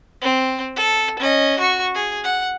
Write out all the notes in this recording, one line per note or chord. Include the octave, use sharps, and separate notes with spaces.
C4
A4
C#4 D#5
F#4 C#6
G#4
F#5